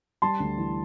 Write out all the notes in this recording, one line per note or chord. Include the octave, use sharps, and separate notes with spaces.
G3 A5 C6
D2
E3